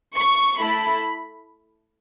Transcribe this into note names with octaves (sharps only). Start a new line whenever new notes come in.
C#6
A3 E4 A4 B5